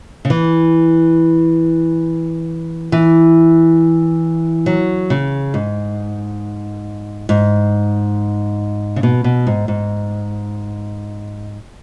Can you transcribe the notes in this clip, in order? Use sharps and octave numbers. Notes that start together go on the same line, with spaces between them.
C#3
E3
E3
F#3
C#3
G#2
G#2
C#3
B2
B2
G#2
G#2